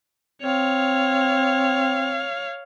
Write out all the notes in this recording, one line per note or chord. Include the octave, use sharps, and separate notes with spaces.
C4 C#5 F5